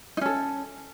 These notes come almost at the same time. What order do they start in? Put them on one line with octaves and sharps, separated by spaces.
D#4 C#4 A4